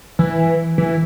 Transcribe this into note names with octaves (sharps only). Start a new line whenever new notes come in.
E3
E3